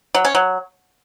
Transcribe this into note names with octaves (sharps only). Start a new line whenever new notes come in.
F#3
C#4
F#3